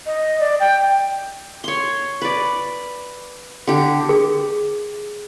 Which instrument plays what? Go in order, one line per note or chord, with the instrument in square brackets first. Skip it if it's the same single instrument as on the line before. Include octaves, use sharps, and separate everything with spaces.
[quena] D#5
D5
G5
[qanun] C#5 C6
B4 D5
D3 G4
[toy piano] G#4